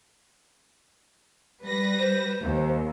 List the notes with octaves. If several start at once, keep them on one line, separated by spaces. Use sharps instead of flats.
G3 B4 A#6
C5
D#2